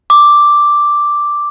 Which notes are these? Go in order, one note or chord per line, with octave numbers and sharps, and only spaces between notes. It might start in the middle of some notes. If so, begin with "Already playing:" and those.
D6